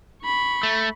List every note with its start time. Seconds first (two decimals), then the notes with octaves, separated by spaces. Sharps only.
0.23 B5 C#6
0.63 A3